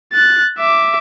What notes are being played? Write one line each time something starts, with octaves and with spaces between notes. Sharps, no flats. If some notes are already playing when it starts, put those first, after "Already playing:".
F#6 A6
E5 D6